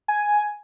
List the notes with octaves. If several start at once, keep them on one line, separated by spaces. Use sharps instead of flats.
G#5